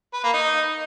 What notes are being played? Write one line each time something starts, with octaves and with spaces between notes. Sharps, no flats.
B4
A#3
D#4